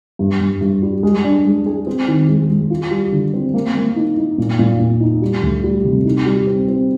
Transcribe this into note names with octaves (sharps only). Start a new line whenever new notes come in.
G2
G2
G2
G3
G#3
D4
G#3
G#4
C4
D#3
G#3
G#3
F4
G3
D3
C4
A#3
A#3
D#4
D#4
A#2
A#2
A#2
D#4
G3
D2
G3
C3
D#4
G3
C4
C4